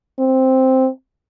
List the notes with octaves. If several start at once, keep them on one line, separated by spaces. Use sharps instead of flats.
C4